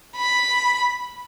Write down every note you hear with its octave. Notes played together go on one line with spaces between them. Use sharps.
B5